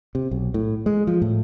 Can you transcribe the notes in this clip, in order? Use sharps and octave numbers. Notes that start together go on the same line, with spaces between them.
C3
B1
A2
G#3
F3
A2